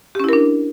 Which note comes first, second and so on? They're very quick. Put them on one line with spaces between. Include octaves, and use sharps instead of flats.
G4 C#4 E4 A#4 D4